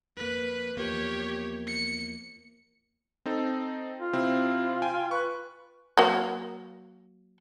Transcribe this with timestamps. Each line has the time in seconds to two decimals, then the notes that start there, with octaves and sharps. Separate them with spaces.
0.17 F2 A#3 B4
0.77 E2 F3 A#3 G4 C#5
1.67 C#7
3.26 C4 D#4 A4
3.99 F4
4.13 C3 C4 E4
4.82 G5 G#5
5.11 B4 C#6 F#6
5.97 F#3 A#3